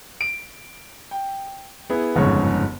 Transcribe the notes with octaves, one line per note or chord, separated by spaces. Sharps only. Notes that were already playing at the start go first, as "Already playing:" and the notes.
D7
G5
B3 E4 G#4
G1 F2 G#2 C#3 C#5 C#6